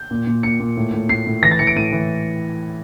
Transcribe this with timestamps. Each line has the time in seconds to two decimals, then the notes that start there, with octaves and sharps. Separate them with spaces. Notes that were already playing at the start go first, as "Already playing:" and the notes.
Already playing: G6
0.11 A#2
0.27 A#2
0.43 A#2 C#7
0.60 A#2
0.77 A2
0.94 A2
1.09 A2 C7
1.27 A2
1.43 E3 A#6
1.51 A6
1.59 E3 C#7
1.67 D7
1.76 A2 D#7
1.92 E3